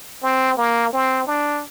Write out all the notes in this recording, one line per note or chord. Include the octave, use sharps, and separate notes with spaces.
C4
A#3
C4
D4